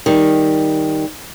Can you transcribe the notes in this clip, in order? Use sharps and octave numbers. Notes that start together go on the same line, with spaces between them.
D#3 G3